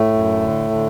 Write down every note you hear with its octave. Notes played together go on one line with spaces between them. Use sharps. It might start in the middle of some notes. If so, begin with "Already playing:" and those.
Already playing: A2 A3
F#2
D3
D3